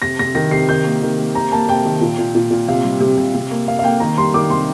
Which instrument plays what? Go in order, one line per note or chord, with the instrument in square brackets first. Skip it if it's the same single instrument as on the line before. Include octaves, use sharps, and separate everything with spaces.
[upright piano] C3 A#6
C3 A#6
D#3 A#6
C3 C7
D#3 G6
A#3
D#3
A#3
C3 A#5
A#3 A5
C3 G5
D#3
A#2
A#2
A#2
A#2
C3 F5
G3
C3
C3
C3
A#3
A#3 F5
F5
A#3 G5
D#3 A#5
G3 C6
D#3 D6
C3 C6